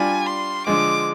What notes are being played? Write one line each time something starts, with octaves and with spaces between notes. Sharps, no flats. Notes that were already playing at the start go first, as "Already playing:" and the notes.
Already playing: G3 D4 F4 G#5
C6
D3 F3 G#3 D6